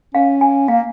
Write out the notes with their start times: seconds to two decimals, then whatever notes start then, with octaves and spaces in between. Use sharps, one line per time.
0.15 C#4 F5
0.41 G#5
0.68 A#3 F5